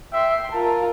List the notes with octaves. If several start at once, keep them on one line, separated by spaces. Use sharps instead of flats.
E5 G5 C6
F4 A#4 A5